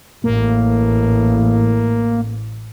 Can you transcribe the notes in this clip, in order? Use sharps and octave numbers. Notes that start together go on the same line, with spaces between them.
A1 A#3